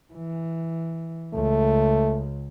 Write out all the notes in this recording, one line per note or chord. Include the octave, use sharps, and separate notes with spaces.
E3
C#2 A3